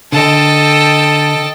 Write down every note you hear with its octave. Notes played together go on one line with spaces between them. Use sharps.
D3 A4 D#5 G5 A5